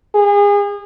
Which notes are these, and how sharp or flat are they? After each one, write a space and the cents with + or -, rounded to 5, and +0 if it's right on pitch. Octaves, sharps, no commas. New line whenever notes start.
G#4 -35